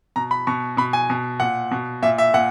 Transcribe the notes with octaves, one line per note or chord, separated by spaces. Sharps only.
B2 A#5
B5
B2 C#6
B2 B5
G#5
B2
A#2 F#5
B2
A#2 E5
E5
A#2 F#5